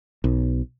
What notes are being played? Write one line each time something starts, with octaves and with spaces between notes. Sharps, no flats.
B1